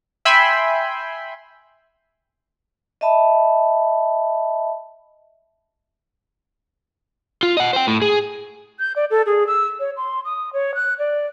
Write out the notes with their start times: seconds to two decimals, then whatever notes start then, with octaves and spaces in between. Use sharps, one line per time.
0.25 E5 G5 G#5 B5 C6
3.01 D#5 E5 A5 B5
7.43 F4
7.57 D#5 F#5
7.73 C5 G5
7.87 A2
8.02 G#4
8.79 G6
8.96 D5
9.11 A4
9.26 G#4
9.47 E6
9.80 C#5
9.97 C6
10.25 D#6
10.53 C#5
10.75 F#6
10.99 D5